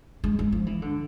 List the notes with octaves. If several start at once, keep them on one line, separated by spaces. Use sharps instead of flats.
G#3
G#3
F3
E3
D3